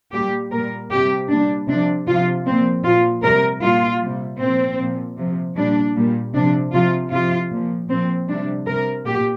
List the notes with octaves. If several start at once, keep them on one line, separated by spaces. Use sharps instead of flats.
A#2 G3 G4
A#2 G3 A#4
C3 G3 G4
A#2 G3 D4
C3 F3 D4
C3 F3 F4
A#2 F3 C4
A#2 F3 F4
C3 G3 A#4
A#2 G3 F4
C3 G3
A#2 F3 C4
A#2 F3
C3 F3
A#2 G3 D4
A#2 G3
C3 F3 D4
C3 F3 F4
C3 F3 F4
A#2 F3
A#2 F3 C4
C3 G3 D4
C3 G3 A#4
A#2 G4